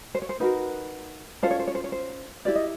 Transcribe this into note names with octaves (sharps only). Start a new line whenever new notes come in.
C5
C#5
C5
D#4 F#4 A#4 B4
C#4 F4 A4 C5
C#5
C5
C#5
C5
C#5
C5
E4 G4 B4 D5
D#5